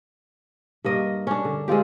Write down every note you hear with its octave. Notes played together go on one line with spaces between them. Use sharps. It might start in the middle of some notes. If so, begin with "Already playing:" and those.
G2 A#3 D#5
C#4 D4
D3
G#3 C4 F4 G4